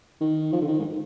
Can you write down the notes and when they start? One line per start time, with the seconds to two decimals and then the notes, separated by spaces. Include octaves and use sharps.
0.21 D#3
0.52 F3
0.62 D3
0.68 D#3
0.79 G#2